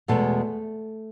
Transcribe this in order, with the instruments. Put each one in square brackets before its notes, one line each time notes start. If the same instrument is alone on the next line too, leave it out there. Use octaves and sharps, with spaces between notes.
[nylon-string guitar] E2 B2 G#3 A3 B3 A4